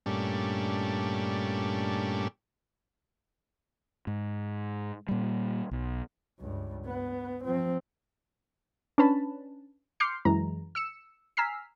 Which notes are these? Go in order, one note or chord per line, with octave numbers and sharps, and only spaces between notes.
G2 A#2 G3 A3 C#4 D4
G#2
A#2 G3
B1
C#2 G2
B3
F3 C4
C#4 D4 B4 A5 B5
C6 D6 F6 G6 C7 C#7
F#2 E3 G#3 A#5
E6 C#7 E7
G#5 A#5 E6 F6 B6 C7